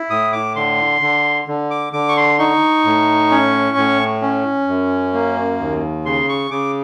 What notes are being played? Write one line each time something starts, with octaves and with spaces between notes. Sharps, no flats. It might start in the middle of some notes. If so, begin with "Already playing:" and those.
Already playing: E4
A2 D#6
D6
D3 C6
D3
D3
D6
D3 D6
C#6
C6
D#4 C#6
A2
C#4
A2
C#4
F#2
A#3
D#2
C#3 C6
C#6
C#3 D6